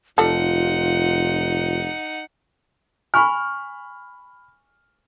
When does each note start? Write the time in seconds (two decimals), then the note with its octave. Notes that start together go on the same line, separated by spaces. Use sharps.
0.18 F1 G3 D#4 F4 A4 F#5
3.14 G#5 B5 C#6 F6